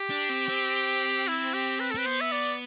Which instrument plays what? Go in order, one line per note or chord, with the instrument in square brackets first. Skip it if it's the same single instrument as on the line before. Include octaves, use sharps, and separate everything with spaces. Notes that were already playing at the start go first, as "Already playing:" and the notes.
Already playing: [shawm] G4
[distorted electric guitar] D4
C4
C4
[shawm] E4
G4
B4
A4
[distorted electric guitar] C4 [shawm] B4
[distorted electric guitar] B3 [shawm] C5
[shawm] E5
D5